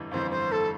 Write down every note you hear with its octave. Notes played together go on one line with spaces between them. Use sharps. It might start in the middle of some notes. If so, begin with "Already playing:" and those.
Already playing: G1 F2 E3
G1 F2 E3 C5
C5
A4